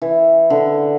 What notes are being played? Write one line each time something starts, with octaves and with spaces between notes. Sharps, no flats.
E3
D3